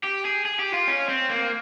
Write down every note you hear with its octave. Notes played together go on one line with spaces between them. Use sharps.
G4
G#4
G#4
G4
F4
C#4
C4
A#3